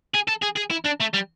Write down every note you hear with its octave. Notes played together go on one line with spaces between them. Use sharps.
G#4
A4
G#4
G#4
E4
D4
A3
G3